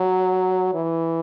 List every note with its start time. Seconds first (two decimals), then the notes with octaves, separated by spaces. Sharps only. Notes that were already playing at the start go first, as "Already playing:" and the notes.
Already playing: F#3
0.74 E3